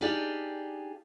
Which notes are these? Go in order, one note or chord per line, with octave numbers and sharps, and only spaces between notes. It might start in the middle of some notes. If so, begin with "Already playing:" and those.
D4 D#4 G4 G#4 D5 F5